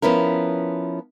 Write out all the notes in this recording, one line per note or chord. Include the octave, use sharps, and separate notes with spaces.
F3 B3 C#4 E4 A#4